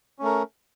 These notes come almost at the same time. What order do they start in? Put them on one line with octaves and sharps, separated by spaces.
C#4 A3 A#4